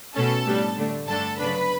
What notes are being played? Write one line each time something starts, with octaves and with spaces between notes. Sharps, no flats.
B2 A3 C#4 A4 A5
A2 G3 B3 D4
D3 A3 D4
G2 D3 A3 D4 A4 A5
C#3 F#3 B3 D4 B4 B5